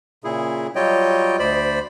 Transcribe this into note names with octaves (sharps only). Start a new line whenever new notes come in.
A#2 C#3 E4 G#4
F#3 G3 F4 C#5 D#5 G5
D2 C5 D5 B5